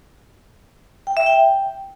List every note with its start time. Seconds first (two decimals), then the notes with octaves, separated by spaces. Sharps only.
1.07 G5
1.17 E5
1.26 G5